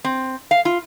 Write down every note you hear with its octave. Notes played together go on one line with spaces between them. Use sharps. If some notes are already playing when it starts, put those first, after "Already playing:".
C4
F5
F4